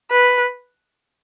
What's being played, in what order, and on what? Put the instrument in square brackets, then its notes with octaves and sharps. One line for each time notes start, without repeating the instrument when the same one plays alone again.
[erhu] B4